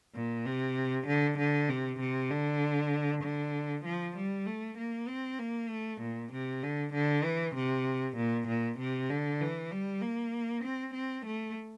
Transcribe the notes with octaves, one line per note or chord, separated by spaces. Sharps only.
A#2
C3
D3
D3
C3
C3
D3
D3
F3
G3
A3
A#3
C4
A#3
A3
A#2
C3
D3
D3
E3
C3
A#2
A#2
C3
D3
E3
G3
A#3
C4
C4
A3